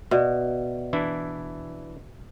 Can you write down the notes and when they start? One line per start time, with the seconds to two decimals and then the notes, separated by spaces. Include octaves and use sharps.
0.11 B2 D5 E5
0.93 E3 D4 E4